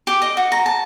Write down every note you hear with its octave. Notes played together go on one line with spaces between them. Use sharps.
G4
D#5
F#4
A#5
A5